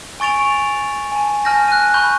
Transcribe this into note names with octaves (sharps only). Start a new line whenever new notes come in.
G#5 C#6 A6 D7 F7
G#5 A5
G#5 A5 F6 G6 A#6
F#6 D#7
B5 C#6 G6